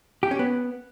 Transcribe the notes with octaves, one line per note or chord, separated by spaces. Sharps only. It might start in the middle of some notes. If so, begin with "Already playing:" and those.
G4
C#4
B3